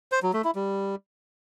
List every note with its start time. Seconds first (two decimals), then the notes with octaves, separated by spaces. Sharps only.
0.12 C5
0.23 F#3
0.34 A3
0.44 E4
0.55 G3